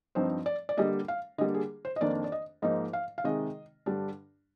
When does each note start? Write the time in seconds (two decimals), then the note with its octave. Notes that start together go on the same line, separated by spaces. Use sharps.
0.15 G2 F3 C4 D#4 C5
0.46 D5
0.69 D5
0.77 D3 G3 A#3 D#5
1.08 F5
1.38 D3 D#5
1.41 G3 A#3
1.54 G#4
1.85 C5
1.96 D#5
2.01 F2 D#3 A#3 D4 D5
2.24 D5
2.32 D#5
2.62 G#2 F3 A#3 D#4 D#5
2.93 F5
3.18 F5
3.24 C3 D#3 G#3 D#4 D#5
3.86 G2 D3 G3 D4